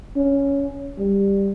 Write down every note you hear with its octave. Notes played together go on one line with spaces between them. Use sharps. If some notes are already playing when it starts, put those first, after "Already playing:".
C#4
G3